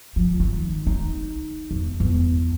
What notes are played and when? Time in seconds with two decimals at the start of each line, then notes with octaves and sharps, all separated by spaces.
0.16 F3
0.40 D#3
0.87 D#4
1.71 E2
2.00 E2